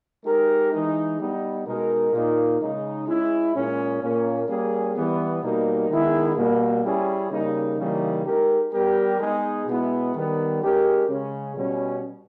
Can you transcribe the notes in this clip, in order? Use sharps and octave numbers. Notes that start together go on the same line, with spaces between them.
G#3 D#4 G4 A#4
E3 G#3 D#4
G3 B3 D#4
B2 G#3 D#4 A#4
A#2 A#3 D#4
C#3 G#3 D#4
G#3 C#4 E4
A#2 G#3 C#4 G#4
A#2 A#3 C#4
G3 A#3 C#4 G#4
E3 G3 B3
B2 G3 A#3 D#4
D#3 G#3 B3 E4 G#4
B2 G3 A#3
G3 C#4 E4 G#4
C#3 G3 A#3 D#4
C#3 E3 G3 A#3 D#4
G#3 D#4 G4 A#4
G3 B3 G4 A#4
G#3 B3 D#4 G#4
B2 G#3 B3 E4
D#3 G3 B3
G#3 C#4 G4 A#4
C#3 G#3 C#4
B2 G3 C#4